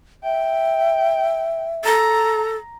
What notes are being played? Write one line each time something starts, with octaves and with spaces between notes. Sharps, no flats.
E5 G5
A4 A#5